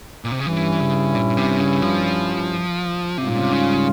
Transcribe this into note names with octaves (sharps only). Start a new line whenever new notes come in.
A#2
C3
C#3
G2 E3 G3 C#4 E4
C#3
A#2
C3
C#3
F3
G#2 C3 G3 C#4 F4
A#2
C3
C#3